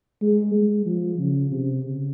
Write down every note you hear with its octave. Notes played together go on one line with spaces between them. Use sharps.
G#3
G#3
F3
C#3
C3
C#3